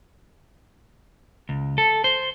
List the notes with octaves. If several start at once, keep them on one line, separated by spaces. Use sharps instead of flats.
C#2
A4
C5